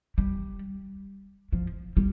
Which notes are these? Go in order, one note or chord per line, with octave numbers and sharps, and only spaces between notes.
G3
F3
G3